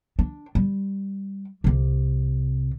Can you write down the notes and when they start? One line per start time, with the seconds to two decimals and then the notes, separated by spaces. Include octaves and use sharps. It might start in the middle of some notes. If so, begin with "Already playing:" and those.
0.19 D4
0.55 G3
1.64 C2 C3